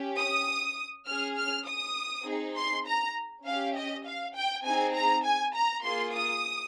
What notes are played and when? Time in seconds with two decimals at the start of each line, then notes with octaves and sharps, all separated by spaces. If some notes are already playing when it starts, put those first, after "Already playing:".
Already playing: C#4 G4
0.17 D#6
1.06 C#4 G#4 F6
1.37 F6
1.66 D#6
2.26 C4 D#4 G#4
2.56 C6
2.86 A#5
3.46 C#4 G4 F5
3.75 D#5
4.05 F5
4.35 G5
4.65 C4 D#4 G#4 G#5
4.95 A#5
5.24 G#5
5.54 A#5
5.83 A#3 F4 G#4 C6
6.14 D#6